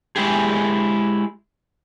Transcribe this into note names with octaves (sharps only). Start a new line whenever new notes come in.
G#3 E4 G4 G#4